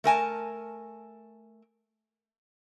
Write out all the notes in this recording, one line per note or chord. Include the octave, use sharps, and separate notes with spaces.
A3 A#4 G#5 A5